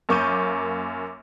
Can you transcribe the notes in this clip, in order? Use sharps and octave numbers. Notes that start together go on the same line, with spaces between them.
F#2 A#3 C#6 D6 G6 D#7